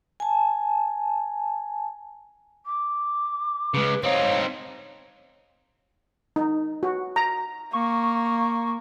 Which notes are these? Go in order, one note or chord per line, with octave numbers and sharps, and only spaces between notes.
G#5 A5
D6
C#3 G#3 B4
C4 D#4 C#5 F5
D#4
F#4
A#5
A#3 C#6